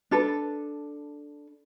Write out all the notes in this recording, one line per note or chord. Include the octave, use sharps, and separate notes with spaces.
D4 A4 B4